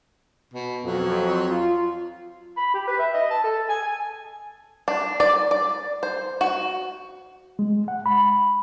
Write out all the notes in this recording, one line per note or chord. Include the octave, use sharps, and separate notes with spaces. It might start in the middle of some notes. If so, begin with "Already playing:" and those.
B2
F2 F#3
F4
B5
G4
B4
E5
D#5
A5
A4
G#5
G#5
D4
D5
D5
C5
F#4
G#3
F#5
B5